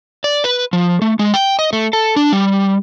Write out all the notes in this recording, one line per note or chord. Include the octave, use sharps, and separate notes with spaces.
D5
B4
F3
A3
G#3
G5
D#5
A3
A4
D4
G3